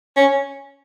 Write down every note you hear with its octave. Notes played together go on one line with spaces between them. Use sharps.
C#4